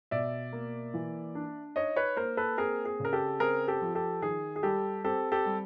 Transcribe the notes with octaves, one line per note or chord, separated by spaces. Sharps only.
B2 D5 E5
A#3
E3
D4
D#4 C#5 D#5
B4 C#5
A#3 A#4 C5
A4 B4
C4 G#4 A#4
G#4
C#3 A#4
G4 A4
C4 G#4 A#4
G4 A4
F3
G4 A4
D#3 G#4
G#4
G3 G4 A4
C4 G4 A4
G4 A4
G3